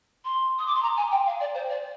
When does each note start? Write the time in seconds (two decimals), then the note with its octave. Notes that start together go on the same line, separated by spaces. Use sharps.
0.25 C6
0.59 D#6
0.66 D6
0.75 C6
0.83 A#5
0.97 G#5
1.11 G5
1.26 F5
1.40 D5
1.55 C5
1.69 D5